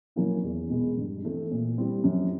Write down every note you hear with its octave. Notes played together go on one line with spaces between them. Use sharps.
F#3 A#3 C#4 E4
E2
B2 G#3 B3
G2
E3 A3 C4
A#2
G3 C4 E4
F#2